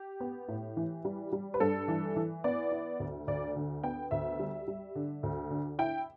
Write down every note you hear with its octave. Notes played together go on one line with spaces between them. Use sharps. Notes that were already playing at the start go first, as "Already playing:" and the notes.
Already playing: G4
B3
A2
E3
G3
G3
B4
G2 A4
E3
E3
B3 D5
E4
D2
D2 D5
D3
B3 G5
D2 E5
G3
G3
D3
D2
D3
E4 G5